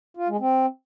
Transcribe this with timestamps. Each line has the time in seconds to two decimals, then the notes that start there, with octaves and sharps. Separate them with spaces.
0.17 F4
0.28 G#3
0.40 C4